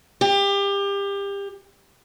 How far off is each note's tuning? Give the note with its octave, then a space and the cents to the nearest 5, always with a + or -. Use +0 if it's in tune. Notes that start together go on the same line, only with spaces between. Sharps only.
G4 +25